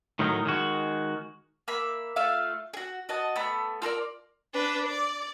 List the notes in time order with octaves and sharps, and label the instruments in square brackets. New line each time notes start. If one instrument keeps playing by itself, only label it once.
[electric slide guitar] A2 D#3 F#3 D#4
D#3 G#3 F#4
[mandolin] A#3 E5 B5
A3 F4 E5 F5
F#4 G#4
F#4 D#5 A5
A3 B3 B5
F4 A4 A#4 D5
[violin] D4 B4
D5